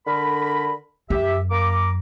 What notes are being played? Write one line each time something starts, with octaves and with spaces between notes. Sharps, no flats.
D3 A#4 B5
F#2 G4 E5
A#3 A#5 D6